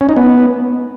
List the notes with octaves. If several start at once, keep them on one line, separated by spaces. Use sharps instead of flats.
C#4
D#4
B3